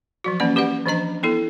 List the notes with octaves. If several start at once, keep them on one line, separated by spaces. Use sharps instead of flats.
F3 F#3 F#4
E3 A#3 C#4 D5
G4 B4 D5 F#5
E3 F3 D4 D#5 A#5
B3 E4 A4